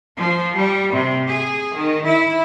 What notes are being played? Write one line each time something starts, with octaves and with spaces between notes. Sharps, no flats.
F3
G3
C3
G#4
D#3
E4